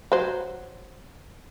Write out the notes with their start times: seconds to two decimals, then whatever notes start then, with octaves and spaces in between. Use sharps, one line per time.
0.12 F#3 C5